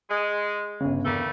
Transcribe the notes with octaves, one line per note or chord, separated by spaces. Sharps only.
G#3
G1 C#3
E2 G3 A3 A#3